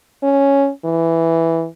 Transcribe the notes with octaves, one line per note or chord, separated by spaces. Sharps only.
C#4
E3